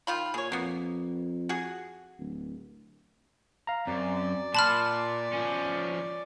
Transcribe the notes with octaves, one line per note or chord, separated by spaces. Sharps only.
D#3 F4 B5
A#2 G#4 C#5
F2 A#3 B3
F#4 G#4
D1
F5 A#5
F#2 C4 D5
A#2 A5 B5 C6 F6 F#6 A6
F3 C#4